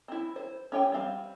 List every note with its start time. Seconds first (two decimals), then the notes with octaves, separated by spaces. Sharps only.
0.08 C4 E4
0.36 C5
0.72 C#4 G4 C#5 G5 G#5
0.92 G3 C4 F5